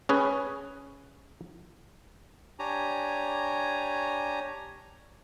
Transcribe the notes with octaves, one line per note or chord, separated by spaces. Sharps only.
C#4 G#4 B4
D4 G4 C#5 G#5 A#5